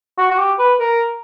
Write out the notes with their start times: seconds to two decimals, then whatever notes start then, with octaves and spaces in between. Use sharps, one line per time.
0.18 F#4
0.31 F#4
0.38 G4
0.59 B4
0.80 A#4